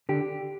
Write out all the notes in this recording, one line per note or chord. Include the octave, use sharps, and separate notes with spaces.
D3 G4